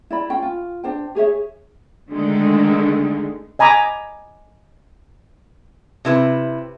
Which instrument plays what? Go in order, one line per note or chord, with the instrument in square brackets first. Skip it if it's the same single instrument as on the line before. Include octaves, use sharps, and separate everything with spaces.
[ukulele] E4 D5 B5
C#4 F4 G5
F4
D4 C5 G5
G4 G#4 C#5 E5
[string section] D3 D#3 G#3 A3
[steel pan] D#5 G#5 A#5 B5 D6
[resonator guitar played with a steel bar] C3 E4 B4